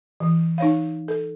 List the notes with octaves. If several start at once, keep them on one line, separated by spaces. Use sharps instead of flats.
E3
D#4 C#5 F5
A4